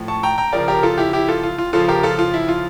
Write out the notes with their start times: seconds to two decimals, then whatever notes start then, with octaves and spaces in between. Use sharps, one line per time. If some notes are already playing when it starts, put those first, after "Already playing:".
Already playing: A2 F3
0.08 A5 C#6
0.23 G5 A#5
0.38 G5 A#5
0.53 C#3 F3 A#4 D5
0.68 G4 A#4
0.83 F4 A4
0.98 E4 G4
1.13 E4 G4
1.28 F4 A4
1.43 F4
1.58 F4
1.73 C#3 F3 F4 A4
1.88 G4 A#4
2.03 F4 A4
2.19 F4
2.34 E4
2.49 F4